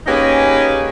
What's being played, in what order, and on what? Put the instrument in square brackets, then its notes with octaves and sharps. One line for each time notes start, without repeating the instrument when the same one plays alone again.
[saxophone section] A#3 C#4 D#4 G4 G#4 B4